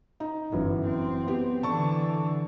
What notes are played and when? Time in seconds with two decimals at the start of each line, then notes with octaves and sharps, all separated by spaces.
0.20 D#4
0.52 G1 F#2 E3
0.86 C4
1.27 B3 G4
1.63 D3 E3 A5 C#6